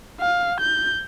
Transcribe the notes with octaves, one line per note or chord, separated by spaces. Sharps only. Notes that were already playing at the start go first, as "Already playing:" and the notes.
F5
G6